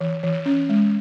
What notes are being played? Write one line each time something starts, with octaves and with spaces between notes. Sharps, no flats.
E3
E3
C#4
G#3